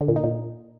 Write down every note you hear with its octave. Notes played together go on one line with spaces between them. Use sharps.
D3
A#2
D#4
A#2